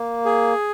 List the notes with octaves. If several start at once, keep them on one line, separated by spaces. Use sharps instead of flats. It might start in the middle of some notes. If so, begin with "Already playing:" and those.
Already playing: A#3
G#4